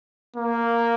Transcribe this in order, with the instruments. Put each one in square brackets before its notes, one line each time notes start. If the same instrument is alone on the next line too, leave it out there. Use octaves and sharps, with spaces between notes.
[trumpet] A#3